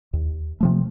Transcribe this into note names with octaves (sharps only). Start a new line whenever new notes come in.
D#2
C3 F3 A3